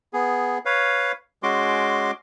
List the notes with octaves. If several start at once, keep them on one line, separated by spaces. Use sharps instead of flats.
B3 G#4
B4 C#5 F5
G#3 C#4 F#4 C6 D6